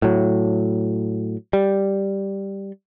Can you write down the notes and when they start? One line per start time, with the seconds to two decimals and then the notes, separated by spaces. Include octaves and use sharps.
0.02 A2 F#3
1.53 G3